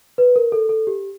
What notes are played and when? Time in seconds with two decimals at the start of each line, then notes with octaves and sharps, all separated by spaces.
0.18 B4
0.36 A#4
0.52 A4
0.69 A4
0.87 G4